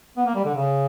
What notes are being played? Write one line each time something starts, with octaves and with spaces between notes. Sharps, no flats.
B3
A#3
G3
D3
C#3